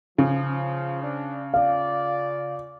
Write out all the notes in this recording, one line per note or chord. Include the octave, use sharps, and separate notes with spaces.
C#3 F3
D4
F4 D5 F5